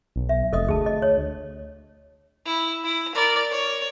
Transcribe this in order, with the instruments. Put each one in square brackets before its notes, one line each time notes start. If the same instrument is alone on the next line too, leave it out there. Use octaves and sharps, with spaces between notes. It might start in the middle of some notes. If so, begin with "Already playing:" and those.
[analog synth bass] B1
[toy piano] E5
[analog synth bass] F1 [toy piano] A4 D#5 D#6
[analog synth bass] D2 [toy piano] G#4 A5
[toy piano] D#5
C#5
[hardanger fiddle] E4
E4
A#4 D5
C#5